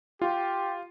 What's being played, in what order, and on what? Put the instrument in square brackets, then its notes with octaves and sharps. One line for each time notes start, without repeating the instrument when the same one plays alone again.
[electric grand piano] F4 [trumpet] G4